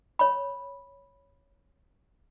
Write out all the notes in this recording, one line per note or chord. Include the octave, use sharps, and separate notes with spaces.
C#5 B5